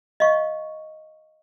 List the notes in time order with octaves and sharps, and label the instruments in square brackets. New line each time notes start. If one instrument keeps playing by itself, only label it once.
[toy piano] D#5 F5 C#6